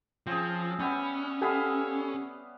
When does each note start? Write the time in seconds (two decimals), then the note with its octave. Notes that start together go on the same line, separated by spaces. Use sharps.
0.27 F3 C4 C#4 G#4
0.80 G3 B3 C#4 E5
1.42 B3 G4 A4 E5 F5 G#5